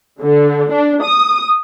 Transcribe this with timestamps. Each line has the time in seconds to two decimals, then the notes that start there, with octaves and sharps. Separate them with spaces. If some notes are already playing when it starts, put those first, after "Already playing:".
0.22 D3
0.71 D4
1.03 D#6